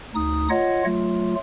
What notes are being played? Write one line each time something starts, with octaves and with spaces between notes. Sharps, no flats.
D2 D#4 D#6
F4 C#5 D#5 F#5
F#3 A3 F4